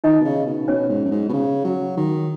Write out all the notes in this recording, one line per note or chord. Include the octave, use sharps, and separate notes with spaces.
D#3 D#4 D#5
B2
C#3
B2
B2 C#4 C#5
G#2
F#2
G#2
B2
C#3
F#3
D#3